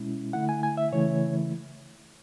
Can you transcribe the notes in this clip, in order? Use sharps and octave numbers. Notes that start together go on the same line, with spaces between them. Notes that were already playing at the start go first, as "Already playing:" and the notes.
Already playing: B2 G#3 C#4 E4
D3 A3 E4 F#5
G#5
G#5
E5
C#3 E3 A3 E4 C#5